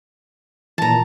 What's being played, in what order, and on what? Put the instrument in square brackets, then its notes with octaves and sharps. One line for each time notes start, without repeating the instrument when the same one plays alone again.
[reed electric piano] A#2 E3 [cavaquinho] A5 A#5